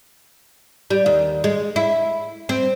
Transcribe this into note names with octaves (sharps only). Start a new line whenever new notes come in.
G3
D#2
G#3
E4
C4